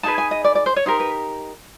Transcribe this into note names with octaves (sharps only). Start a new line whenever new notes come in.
D#4 G#4 B4 A5
G#5
D#5
D5
D5
C5
C#5
D#4 G4 A#4 C5
B4